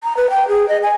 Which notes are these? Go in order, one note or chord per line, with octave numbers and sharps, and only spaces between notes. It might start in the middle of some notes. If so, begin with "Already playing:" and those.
A#5
B4
G5
G#4
D#5
G#5